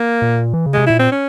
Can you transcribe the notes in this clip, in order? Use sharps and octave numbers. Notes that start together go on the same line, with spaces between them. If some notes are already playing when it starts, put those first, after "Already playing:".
Already playing: A#3
A#2
E3
C#3
G#3
C3
A#2 E4
C4
C#4